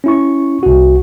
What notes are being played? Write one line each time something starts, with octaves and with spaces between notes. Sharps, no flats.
C#4 E4 C#6
C2 F#4